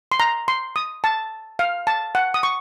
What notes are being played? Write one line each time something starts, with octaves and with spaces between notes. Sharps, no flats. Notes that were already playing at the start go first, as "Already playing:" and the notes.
C6
A#5
C6
D#6
A5
F5
A5
F#5
D#6
C#6